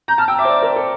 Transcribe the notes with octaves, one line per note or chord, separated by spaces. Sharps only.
A#5 G6
A5 F6
G5 E6
E5 D6
C5
D5
A#4
A4